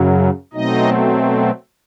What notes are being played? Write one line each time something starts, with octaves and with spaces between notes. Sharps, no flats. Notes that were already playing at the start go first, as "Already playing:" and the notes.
Already playing: F#2 C#3 F#3
B2 F#3 A3 C4 D#4 D#5